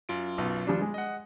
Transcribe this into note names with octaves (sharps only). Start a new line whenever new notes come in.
F#2 F4 D7
B1
F3 G3 D4
G#3
D#5 F#5